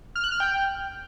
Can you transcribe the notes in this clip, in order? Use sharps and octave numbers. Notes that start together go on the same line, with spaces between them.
F6
F#6
F6
G5